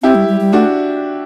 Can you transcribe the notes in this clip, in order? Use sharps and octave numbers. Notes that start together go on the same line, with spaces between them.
C4 E4 G4
G3
G3
G3
A3 D4 F#4